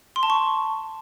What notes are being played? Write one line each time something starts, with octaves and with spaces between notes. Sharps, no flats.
C6
A5
C#6